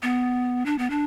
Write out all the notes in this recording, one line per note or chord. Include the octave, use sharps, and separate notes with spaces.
B3
D4
B3
D4